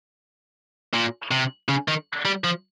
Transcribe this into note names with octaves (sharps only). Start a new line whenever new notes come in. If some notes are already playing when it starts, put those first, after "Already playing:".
A#2
C3
C#3
D#3
G3
F3